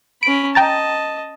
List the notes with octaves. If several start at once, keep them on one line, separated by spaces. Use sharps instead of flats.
C#4 B5 D7
D#5 G5 A5 A#5 A6